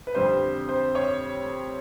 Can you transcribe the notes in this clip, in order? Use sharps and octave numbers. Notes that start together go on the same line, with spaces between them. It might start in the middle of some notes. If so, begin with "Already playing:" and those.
B4
F2 D3 G3 C4 C5
C5
C#5